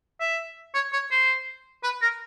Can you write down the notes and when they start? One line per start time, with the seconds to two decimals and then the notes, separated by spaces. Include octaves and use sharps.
0.20 E5
0.75 C#5
0.93 C#5
1.11 C5
1.83 B4
2.02 A#4